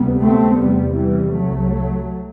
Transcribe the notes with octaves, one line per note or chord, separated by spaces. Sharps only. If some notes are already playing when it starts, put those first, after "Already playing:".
Already playing: D2 C3 G3 B3
A3 C4
E2 C3 G3 B3
E3 G3
C2 C3 F#3 A3